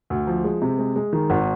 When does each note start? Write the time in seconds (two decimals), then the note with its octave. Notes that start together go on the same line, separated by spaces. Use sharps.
0.10 D2
0.27 F3
0.44 G#3
0.62 C3
0.79 G#3
0.96 G#3
1.13 D#3
1.30 G#1